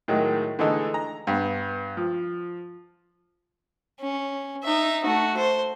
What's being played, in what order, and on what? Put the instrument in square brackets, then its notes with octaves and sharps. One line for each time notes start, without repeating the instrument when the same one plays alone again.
[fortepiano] A2 D#3 F#3 G#3
D3 E3 G#3 A3 D#4 A4
A#5
G2 B3
F3
[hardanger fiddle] C#4
D#4 E5
A3 F#4
C5